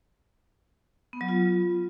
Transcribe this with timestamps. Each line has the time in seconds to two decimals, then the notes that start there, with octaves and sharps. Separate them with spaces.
1.13 B3
1.21 F#3
1.29 F4